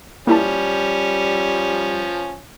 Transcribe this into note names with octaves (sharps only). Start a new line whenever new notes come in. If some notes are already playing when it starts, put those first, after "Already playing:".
F3 G3 A#3 C#4 E4 A5